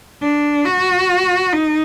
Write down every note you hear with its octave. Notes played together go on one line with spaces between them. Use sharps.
D4
F#4
D#4